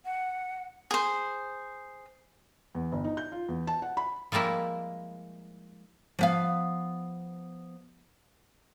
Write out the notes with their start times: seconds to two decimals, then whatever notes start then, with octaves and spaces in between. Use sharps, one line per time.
0.05 F#5
0.91 G#4 C5
2.75 E2
2.92 G1
3.04 D#4
3.17 G6
3.32 F4
3.48 E2
3.67 A5
3.82 F#5
3.97 B5
4.32 F3 G3 G#3 A#3 E4
6.19 F3 B3 F5